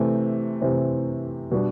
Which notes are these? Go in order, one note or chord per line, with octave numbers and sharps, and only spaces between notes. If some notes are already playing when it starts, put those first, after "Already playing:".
Already playing: C3 E3 A3 C4
C3 E3 A3 C4
B2 G3 B3 D4